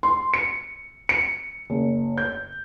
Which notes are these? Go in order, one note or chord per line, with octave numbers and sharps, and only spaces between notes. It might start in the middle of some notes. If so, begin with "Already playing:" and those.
C6
C#7
C#7
F#1
G6